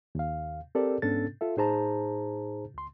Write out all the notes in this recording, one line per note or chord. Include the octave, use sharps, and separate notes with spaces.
D#2 F5
C4 G4 A4 A#4 D5
G#2 B3 C#4 D4 A4 A6
F4 A4 E5
A2 D#4 G#4 C5 A5 A#5
C#2 C6